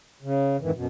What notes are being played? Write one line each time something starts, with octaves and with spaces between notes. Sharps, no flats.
C#3
F2 G#2 D#3 E3
F#2 B2